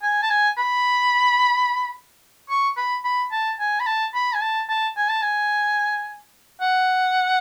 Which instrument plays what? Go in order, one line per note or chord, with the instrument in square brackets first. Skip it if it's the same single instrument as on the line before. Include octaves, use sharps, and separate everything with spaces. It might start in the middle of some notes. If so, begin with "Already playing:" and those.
[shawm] G#5
A5
G#5
B5
C#6
B5
B5
A5
G#5
B5
A5
B5
G#5
A5
A5
G#5
A5
G#5
F#5